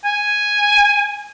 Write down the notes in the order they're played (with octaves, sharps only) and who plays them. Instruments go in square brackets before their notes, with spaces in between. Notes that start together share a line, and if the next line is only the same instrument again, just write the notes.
[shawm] G#5